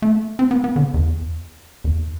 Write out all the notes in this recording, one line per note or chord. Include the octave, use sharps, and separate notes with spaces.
A3
C4
B3
B3
D3
E2
E2